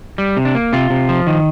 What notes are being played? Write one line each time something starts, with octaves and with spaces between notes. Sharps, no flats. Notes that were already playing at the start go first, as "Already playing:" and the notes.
G3
C3
D4
A#3
C3 F4
C3
F3
D#3